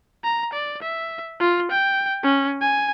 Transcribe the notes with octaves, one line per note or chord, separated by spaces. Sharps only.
A#5
D5
E5
F4
G5
C#4
G#5